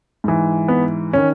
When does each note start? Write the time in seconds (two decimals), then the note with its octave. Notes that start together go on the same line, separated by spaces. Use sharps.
0.24 G#2 E3
0.68 B3
1.13 D#3 C#4